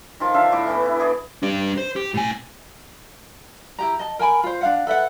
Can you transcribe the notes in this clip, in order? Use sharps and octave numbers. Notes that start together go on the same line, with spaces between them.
D#3 F3 F4
D3 D4 E5 F5
A2 E4 D6
E3 B3
E4
E3 G#4 D5
D4 G4
C5
G4
A2 G#5
E4 G4 A#5
D#5 A5
A#4 G5 G#5 B5
F4 C5
D4 F5 F#5
A4 B4 E5 F#5